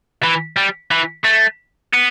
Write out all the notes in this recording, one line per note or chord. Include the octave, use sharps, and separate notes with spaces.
E3
G3
E3
A3
B3